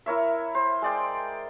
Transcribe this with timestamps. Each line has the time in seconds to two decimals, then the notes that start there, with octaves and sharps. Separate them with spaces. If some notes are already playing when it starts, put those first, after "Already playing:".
0.06 E4 A#4 C#5 E5
0.55 C5
0.82 G#3 D5 G5